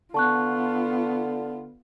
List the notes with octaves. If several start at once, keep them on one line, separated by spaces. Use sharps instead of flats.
D3 B3 F4 A5 C#6 F#6